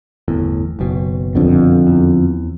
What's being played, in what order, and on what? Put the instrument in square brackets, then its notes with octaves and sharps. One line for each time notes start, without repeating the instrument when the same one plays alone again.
[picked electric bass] G1 E2 A2
F#1 B1 B2
[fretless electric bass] F2 D3
[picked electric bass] E2